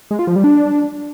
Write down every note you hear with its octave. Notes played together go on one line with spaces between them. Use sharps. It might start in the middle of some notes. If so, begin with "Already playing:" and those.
G#3
F4
F3
G3
D4